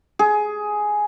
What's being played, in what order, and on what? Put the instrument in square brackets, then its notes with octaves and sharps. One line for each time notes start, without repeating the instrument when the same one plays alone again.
[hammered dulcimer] G#4